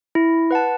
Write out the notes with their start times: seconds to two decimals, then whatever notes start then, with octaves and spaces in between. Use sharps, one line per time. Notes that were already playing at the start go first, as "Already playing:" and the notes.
0.15 E4
0.51 B4 F#5 A5